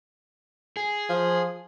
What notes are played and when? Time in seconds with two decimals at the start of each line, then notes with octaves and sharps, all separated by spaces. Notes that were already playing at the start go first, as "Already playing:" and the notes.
0.77 G#4
1.10 F3